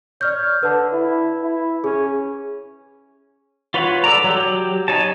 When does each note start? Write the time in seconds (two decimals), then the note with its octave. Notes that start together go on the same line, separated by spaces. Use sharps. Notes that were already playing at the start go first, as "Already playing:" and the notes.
0.21 C#5 D5 F6 G6
0.63 D3 B4 A5
0.92 E4
1.43 E4
1.84 C#4 G#4
3.74 F4 B4 C#5 F#5
4.04 A4 D5 A#5
4.24 F#3 G4
4.88 D#4 C#5 A5